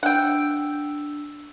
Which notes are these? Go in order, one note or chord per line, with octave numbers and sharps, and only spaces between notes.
D4 F#5 G5 E6